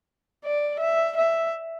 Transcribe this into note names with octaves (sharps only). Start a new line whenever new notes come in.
D5
E5
E5